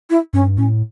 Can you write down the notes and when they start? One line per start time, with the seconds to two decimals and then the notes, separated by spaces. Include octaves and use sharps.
0.10 E4
0.33 G2 C#4
0.57 A2 C#4